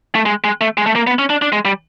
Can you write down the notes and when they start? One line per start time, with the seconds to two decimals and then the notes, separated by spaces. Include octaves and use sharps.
0.15 A3
0.26 G#3
0.44 G#3
0.61 A3
0.78 G#3
0.86 A3
0.96 A#3
1.07 B3
1.19 C#4
1.30 D4
1.42 D4
1.52 G#3
1.65 G3